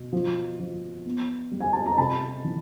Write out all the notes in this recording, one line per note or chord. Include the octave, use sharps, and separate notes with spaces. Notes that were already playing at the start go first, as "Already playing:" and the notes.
Already playing: B2
F3
F3
B3
G3
G#5
A5
A#5
C3 A5 B5
E3